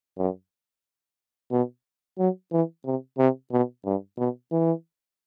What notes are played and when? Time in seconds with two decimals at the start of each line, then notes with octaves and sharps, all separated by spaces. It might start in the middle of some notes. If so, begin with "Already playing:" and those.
0.18 F#2
1.51 B2
2.19 F#3
2.52 E3
2.85 C3
3.18 C3
3.52 B2
3.85 G2
4.18 B2
4.52 E3